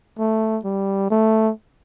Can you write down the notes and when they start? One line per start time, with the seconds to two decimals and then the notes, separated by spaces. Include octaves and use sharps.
0.19 A3
0.64 G3
1.10 A3